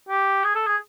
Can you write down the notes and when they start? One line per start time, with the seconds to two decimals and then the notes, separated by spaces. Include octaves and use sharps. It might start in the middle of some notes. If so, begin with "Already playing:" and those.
0.09 G4
0.44 G#4
0.55 A4
0.67 G#4